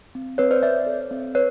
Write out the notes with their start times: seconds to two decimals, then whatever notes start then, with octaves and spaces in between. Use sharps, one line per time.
0.15 C4
0.38 C4 B4 C#5
0.51 C5 D5
0.63 C4 D5 E5
0.87 A4
1.11 C4
1.35 B4 C#5